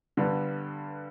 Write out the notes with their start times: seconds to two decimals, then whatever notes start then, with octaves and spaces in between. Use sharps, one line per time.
0.17 G2 D3 G3 B3